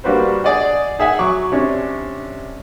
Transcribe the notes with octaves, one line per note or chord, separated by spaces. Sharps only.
G3 A#3 D4 F#4 B4 C5
G#4 D5 D#5 F#5
D#4 G#4 E5 F#5 G#5
F#3 C#6 D6
C3 C#4 D4